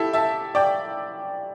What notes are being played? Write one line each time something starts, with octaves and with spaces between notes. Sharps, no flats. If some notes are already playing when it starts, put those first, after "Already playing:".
Already playing: E4 G4 A4 G5
E5 A5
D5 G5